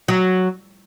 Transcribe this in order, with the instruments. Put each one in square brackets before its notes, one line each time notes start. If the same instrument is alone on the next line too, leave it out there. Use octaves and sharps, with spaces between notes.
[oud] F#3